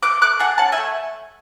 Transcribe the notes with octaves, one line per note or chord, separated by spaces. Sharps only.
A3 D6 F#6
A3 D6 F#6
G#4 F#5 A5
C#4 F#5 A5
E5 G#5
A3